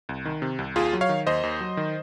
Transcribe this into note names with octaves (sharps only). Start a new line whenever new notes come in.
C2
D#3
C3
C2
D#2 F4 G#4
F#3
C#5 F5
D#3
D#2 C5 D#5
D#2
F#3
D#3